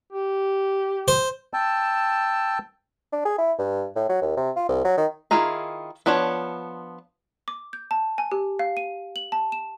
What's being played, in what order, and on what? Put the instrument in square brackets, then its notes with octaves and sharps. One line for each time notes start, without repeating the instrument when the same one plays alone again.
[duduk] G4
[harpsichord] C5
[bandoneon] G5 A5 E6
[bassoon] D4
G#4
E4
G2
A2
F#3
D#2
C3
F4
C2
F#3
D#3
[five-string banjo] D#3 E4 F4 G#4 A#5
F3 B3 D4 F4 C#5
[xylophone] D6
G6
A5
G#5
G4
F5
D#7
F#7
A5
E7